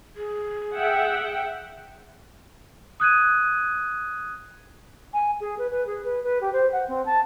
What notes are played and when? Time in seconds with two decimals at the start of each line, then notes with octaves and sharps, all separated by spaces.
0.16 G#4
0.74 E5 F#5 G5
3.00 D#6 F#6 G#6 D#7
5.13 G#5
5.40 G#4
5.58 B4
5.71 B4
5.87 G#4
6.05 B4
6.24 B4
6.41 G4
6.53 C5
6.72 F#5
6.88 C4
7.06 A5